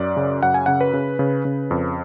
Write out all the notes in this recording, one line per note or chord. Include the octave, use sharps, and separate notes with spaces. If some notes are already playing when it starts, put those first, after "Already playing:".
Already playing: F#2 D5
C#3
F#2 F#5
G#5
C#3 F#5
B4
C#3
C#3
C#3
F2